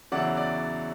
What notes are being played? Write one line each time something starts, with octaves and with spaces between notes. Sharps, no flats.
E2 C#3 F#3 C#4 E4 D5 F#5
D5